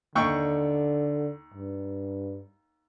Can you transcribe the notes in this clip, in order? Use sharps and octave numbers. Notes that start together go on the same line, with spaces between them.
D#2 D3 G5 C#6
G2